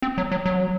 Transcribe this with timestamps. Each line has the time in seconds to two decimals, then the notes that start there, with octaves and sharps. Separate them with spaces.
0.02 C4
0.18 F#3
0.32 F#3
0.46 F#3